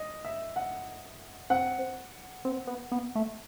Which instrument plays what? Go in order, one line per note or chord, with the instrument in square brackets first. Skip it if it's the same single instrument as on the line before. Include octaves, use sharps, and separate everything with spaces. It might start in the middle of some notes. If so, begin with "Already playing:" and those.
Already playing: [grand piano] D#5
E5
F#5
[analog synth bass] C4 [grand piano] F#5
[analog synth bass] C4
B3
B3
A3